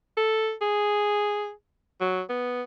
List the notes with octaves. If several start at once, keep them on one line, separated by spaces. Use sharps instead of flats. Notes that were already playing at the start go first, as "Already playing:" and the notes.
A4
G#4
F#3
B3